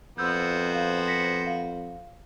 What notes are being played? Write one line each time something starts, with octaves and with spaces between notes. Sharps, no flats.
F2 B3 F#4 C5 E6 G6
F5
A#6 B6 C#7
F5